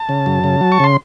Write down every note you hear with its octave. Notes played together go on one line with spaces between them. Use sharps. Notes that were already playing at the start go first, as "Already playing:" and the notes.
Already playing: A5
C#3
F#2
C#3
F#3
C#6
C#3 C6